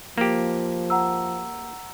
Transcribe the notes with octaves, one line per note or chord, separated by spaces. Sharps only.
F3 A#3 G4
F#5 A#5 E6